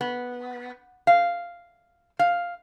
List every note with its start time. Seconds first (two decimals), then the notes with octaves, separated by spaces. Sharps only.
0.01 B3
1.07 F5
2.19 F5